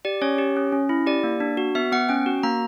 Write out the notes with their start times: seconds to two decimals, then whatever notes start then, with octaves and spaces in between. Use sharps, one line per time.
0.05 G4 D5
0.22 C#4 C#5
0.38 G4
0.57 C#4
0.72 C#4
0.89 E4
1.06 G4 D5
1.24 A#3
1.40 D4
1.57 F#4
1.75 B3 E5
1.92 B3 F#5
2.09 C#4 G5
2.26 F#4
2.43 A#3 A#5